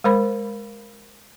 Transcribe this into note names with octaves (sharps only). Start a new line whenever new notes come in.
G#3 A#4 C5 B5